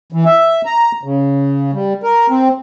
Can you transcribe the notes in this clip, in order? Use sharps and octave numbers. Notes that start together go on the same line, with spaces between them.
E3
E5
A#5
C#3
G3
A#4
C4